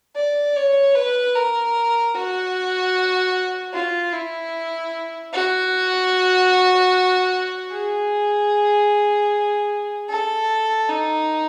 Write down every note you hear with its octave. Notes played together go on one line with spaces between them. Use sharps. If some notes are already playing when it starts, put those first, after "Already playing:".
D5
C#5
B4
A#4
F#4
F4
E4
F#4
G#4
A4
D#4